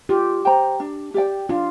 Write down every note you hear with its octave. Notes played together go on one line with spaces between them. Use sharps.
F4 G4
C5 G5 A#5
D4
G4 D5 G5
D4 F4